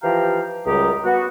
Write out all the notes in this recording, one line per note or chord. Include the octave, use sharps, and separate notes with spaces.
E3 F3 G4 F5 G5 A#5
C#2 F#2 G3 G4 D#5 A#5
B3 F#4